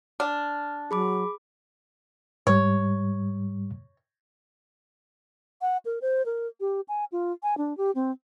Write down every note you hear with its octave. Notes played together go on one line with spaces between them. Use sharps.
D4 F6
F#3 G#4 B5 D6
G#2 G3 C#5
F#5
A#4
C5
A#4
G4
G#5
F4
G#5
D4
G4
C4